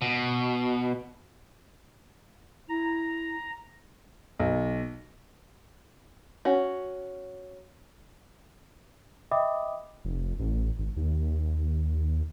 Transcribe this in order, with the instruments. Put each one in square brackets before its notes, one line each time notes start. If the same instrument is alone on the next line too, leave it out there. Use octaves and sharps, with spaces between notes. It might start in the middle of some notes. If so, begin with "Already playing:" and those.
[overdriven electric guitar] B2
[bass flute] E4 [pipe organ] A#5
[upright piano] B1
[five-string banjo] C#4 F#4
[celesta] D#5 E5 G5 B5 D6 D#6
[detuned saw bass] F1
A1
G#1
D#2